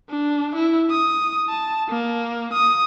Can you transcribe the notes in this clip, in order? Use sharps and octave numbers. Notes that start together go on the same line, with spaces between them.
D4
E4
D#6
A5
A#3
D#6